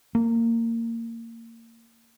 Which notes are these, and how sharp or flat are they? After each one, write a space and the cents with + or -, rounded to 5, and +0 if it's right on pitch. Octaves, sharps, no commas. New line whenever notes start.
A#3 -25